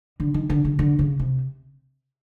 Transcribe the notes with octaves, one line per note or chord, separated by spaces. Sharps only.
D3
D#3
D3
C#3
D3
C#3
C3